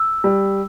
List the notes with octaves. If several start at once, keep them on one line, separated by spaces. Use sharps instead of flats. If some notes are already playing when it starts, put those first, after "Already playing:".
Already playing: E6
G3